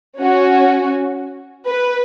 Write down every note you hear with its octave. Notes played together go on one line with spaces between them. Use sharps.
C#4 F#4
B4